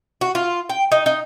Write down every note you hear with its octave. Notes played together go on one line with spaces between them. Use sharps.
F#4
F4
G5
D#4
D#4